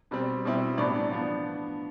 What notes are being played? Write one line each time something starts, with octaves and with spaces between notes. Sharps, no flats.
B2 G3 C4
B2 G3 C4 E4
A2 E3 B3 D4 D5
F3 B3 D4